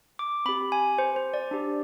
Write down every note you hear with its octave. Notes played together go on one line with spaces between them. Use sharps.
D6
C4 G4 B5
G#5
C5
C5
D5
D4 G4